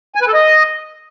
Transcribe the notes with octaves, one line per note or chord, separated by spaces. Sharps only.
G#5
B4
A4
D#5